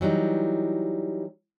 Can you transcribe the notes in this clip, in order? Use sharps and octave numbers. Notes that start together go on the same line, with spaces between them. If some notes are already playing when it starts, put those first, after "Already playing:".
E3 F#3 G3 D#4